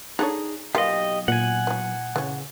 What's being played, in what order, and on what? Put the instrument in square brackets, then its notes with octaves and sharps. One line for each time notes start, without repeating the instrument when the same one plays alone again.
[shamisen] D4 A4 C#5 [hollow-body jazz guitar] D#4 G#4
[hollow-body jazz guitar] B1 F5 [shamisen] A#3 B3 F4 [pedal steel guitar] G4 D#5
[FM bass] A#2 [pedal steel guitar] F#5 G#5
[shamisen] E3 F#3
[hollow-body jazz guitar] C#3 [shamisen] E3 C#4